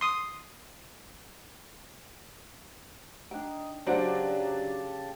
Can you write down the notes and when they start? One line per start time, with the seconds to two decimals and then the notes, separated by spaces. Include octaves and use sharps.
0.01 C6 D#6
3.31 D4 D#4 G5
3.86 C#3 F#3 D4 G4 C5 F#5 A5 D7